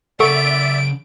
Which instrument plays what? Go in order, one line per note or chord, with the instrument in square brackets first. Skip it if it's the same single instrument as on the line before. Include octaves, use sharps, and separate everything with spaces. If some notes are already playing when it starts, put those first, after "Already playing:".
[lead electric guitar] C#3 F#5 [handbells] A4 C#6 [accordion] D5 E5 [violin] D7